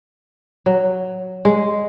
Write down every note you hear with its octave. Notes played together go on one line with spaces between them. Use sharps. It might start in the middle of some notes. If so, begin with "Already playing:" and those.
F#3
G#3